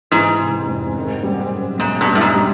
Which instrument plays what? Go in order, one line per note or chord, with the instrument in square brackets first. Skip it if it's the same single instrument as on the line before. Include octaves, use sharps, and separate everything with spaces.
[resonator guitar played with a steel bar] G#2 [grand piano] E3
[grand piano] C3
F1
D#3
G3
F#2
[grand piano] E1 [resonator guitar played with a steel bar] G#2
[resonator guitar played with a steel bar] G2
[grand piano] G3
[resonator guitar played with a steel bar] A2
G#2
[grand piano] G3